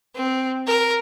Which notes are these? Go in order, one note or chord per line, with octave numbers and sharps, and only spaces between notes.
C4
A#4